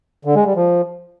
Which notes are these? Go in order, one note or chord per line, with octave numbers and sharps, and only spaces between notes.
D3
G#3
G3
F3